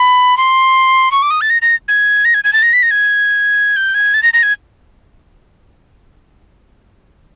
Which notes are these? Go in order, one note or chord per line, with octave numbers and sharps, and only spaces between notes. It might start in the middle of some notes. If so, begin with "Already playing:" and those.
Already playing: B5
C6
C#6
D6
D#6
A6
A#6
A#6
G#6
A#6
G#6
G#6
A6
A#6
B6
A#6
G#6
G6
G#6
A6
A#6
A#6
G#6